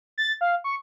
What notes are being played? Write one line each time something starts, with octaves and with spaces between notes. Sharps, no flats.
A6
F5
C#6